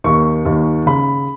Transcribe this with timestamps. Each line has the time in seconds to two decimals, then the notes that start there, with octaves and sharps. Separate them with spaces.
0.04 D#2 D#3 C#6
0.45 D#2 D#3
0.86 C#3 B5